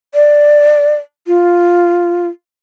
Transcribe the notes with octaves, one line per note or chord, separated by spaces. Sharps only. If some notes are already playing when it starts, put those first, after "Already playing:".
D5
F4